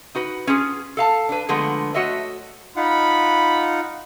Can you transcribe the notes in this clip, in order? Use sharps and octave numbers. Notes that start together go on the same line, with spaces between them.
D#4 F#4 B4
C#4 F4 G#4
A4 F5 A5
D4 B4
D3 F3 G#3 A3 B3
A3 F#4 C#5 D#5 E5
D#4 F4 F#5 B5